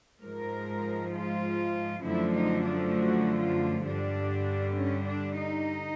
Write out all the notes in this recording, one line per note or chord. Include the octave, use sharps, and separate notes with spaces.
G#2 F3 G#3 A#4
F4
F#2 D3 F3 A3 E4
D#4
D4
F#4
F4
G2 D3 G3 D4
C#4
D4
D#4